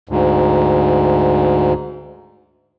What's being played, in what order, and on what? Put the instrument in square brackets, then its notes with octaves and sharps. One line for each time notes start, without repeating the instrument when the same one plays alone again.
[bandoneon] D2 G#2